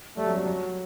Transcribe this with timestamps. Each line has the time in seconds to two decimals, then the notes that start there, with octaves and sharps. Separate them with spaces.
0.17 G3 A3
0.26 F#3
0.35 G3
0.46 F#3